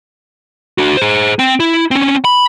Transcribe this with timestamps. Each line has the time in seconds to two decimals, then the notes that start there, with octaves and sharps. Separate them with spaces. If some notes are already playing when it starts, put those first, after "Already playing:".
0.78 D4 F#4
0.97 G#4 C5
1.39 C4 G5
1.60 E4
1.91 C4 C#4
2.25 B5